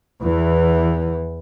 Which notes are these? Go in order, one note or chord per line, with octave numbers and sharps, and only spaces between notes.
E2 E3